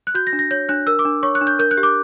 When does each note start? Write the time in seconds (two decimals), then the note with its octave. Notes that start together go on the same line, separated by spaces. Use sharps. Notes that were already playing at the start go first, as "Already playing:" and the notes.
0.07 F#6
0.15 F#4 G6
0.27 A#6
0.33 D4
0.39 A#6
0.51 C#5 G6
0.69 D4 F#6
0.87 A#4 E6
0.99 D6
1.05 D4
1.23 C#5 C#6
1.35 F#6
1.41 D4
1.47 G6
1.59 A#4 G6
1.71 F#6
1.77 G4
1.83 D6